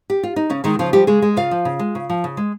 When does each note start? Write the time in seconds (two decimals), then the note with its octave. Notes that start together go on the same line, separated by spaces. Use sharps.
0.10 G4
0.23 F4
0.36 D#4
0.50 C#3 C#4
0.64 D#3 G#3 D#4
0.79 C#3 F3 F4
0.93 F3 G3 G4
1.07 C#3 G#3 G#4
1.22 G#3
1.36 C#3 F4 F5
1.51 F3
1.65 C#3
1.79 G#3
1.95 C#3
2.10 F3
2.24 C#3
2.37 G#3